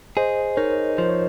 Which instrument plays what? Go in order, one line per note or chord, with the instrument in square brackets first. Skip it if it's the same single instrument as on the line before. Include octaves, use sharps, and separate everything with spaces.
[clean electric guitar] G#4 [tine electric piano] C5 D#5
[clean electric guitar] D#4 [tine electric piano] A#4 C#5
[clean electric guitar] F3 [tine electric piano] C5
[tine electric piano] C#5